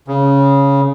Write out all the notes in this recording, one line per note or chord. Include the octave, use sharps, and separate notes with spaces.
C#3